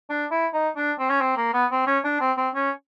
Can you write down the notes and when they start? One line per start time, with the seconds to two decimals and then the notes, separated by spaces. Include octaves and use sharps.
0.10 D4
0.31 E4
0.53 D#4
0.76 D4
0.99 C4
1.10 C#4
1.21 C4
1.37 A#3
1.54 B3
1.71 C4
1.87 C#4
2.04 D4
2.20 C4
2.37 C4
2.55 C#4